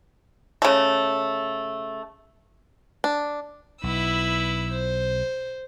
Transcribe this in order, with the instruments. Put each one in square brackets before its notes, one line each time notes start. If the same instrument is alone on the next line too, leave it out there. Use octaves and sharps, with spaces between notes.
[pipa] C#3 A3
[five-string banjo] D4
[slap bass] B1 [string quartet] E4 B4 E6
[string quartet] C5